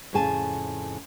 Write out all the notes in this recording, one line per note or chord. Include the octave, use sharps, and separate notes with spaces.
F2 A2 C#3 G#4 G#5 A5